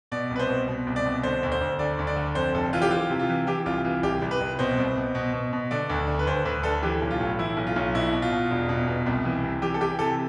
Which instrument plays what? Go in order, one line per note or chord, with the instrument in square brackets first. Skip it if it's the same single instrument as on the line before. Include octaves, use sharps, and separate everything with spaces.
[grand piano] B2 D5
C2
B4
C5
B2
B2
C2
D5
B2
D3 C5
D2
C5
D2
D3 D5
D2
D5
D3
F2 C5
F1 A4
E3 F4
G4
E3 F4
C3
F4
E3
E3 G4
C2 F4
E3 F4
C2 G4
C2
B4
C2
B2 C5
C2
B2
B2
B2
B2
D3 D5
D2
D3
B4
D2 C5
D2 B4
D3 A4
E3 G4
B1
F4
A2
E3 E4
B1
F4
B1
B2 E4
B2
F4
B2
E1
B2
B2
C2
E3
C3
E3 G4
A4
E3 G4
C3 A4